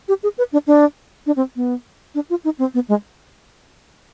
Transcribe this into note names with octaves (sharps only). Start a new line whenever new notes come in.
G4
G#4
B4
D4
D4
D4
C4
B3
D4
F4
D#4
C4
B3
G#3